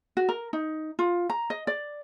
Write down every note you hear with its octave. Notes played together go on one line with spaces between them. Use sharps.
F#4
A#4
D#4
F4
A#5
D#5
D5